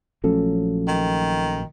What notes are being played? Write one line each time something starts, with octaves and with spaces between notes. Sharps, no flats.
A#1 F3 F#3 A3 C#4 A4
D#3